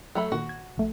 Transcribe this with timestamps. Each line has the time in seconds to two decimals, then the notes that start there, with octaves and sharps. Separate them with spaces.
0.15 F#3 A3 B5
0.32 A#2 D#3 F#4
0.49 G#6
0.78 A#1 A3